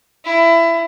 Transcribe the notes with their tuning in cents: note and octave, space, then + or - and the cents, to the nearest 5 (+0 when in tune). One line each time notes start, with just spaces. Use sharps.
E4 +20